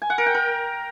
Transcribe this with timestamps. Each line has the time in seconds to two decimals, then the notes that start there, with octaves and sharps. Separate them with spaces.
0.02 G#5
0.10 F#5
0.18 A#4
0.26 G5
0.35 A#4